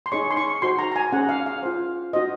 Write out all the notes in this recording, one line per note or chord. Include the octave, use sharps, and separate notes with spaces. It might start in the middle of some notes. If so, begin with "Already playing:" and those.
C6
D#4 G#4 C#5 C#6
C6
C#6
D#4 F#4 C5 C6
A#5
A#5
G#5
C#4 G#4 C5 F#5
F5
F5
F4 C5
D#4 F#4 C5 D#5